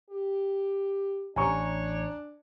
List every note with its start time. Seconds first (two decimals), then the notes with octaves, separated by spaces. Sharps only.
0.10 G4
1.36 A1 A2 D4 C#5 G#5 A#5 C#6